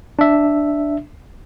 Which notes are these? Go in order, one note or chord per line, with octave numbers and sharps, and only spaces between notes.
D4 E5